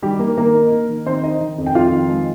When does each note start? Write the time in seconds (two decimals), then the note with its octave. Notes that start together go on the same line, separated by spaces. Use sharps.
0.02 D#3 G3 G4
0.19 D#3 A#3 A#4
0.37 D#3 A#3 A#4
0.55 D#4
0.72 A#3
0.89 D#3
1.06 D#3 C4 C5
1.23 D#4 D#5
1.40 D#3
1.58 F2
1.66 G5
1.75 F2 F4 F5
1.92 D#3
2.09 G#3